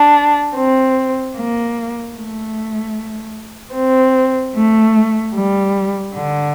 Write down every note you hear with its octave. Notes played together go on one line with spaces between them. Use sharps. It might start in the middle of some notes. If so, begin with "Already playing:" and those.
Already playing: D4
C4
A#3
A3
C4
A3
G3
D3